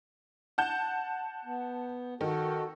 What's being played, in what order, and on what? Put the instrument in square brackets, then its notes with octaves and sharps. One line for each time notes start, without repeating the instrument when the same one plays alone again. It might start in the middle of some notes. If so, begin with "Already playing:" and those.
[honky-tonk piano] F#5 A5 G6
[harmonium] B3
[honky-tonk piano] D#3 [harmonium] F#4 A4